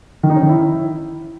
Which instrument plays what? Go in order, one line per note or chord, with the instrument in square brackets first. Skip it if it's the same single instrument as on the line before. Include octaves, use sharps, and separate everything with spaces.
[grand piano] D#3
D#4
C#4
D#3
E4